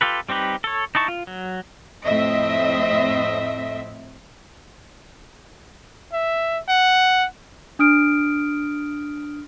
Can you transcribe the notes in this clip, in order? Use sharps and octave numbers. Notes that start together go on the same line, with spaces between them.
F4 G4 A4 B4
G3 C4 D#4 G4 B4
A4 C#5
D#4 E4 A5 C#6
F4
F#3
F2 A2 C4 D#5 E5
E5
F#5
D4 D#6 F6 D7